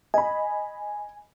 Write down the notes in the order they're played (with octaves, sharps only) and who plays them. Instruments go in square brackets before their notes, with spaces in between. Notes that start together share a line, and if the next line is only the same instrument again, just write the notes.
[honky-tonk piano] D#5 B5 [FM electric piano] G#5